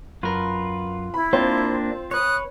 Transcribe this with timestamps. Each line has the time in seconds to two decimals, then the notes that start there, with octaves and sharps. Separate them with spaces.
0.23 F#2 F4 A#4 B4
1.14 E4 B5
1.33 A#3 C4 D4 F4 C5
2.11 B4 C#5 D#6 F#6